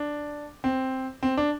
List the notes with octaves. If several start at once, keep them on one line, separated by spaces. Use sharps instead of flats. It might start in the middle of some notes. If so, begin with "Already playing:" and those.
Already playing: D4
C4
C4
D4